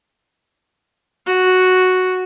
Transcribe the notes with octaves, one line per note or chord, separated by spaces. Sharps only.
F#4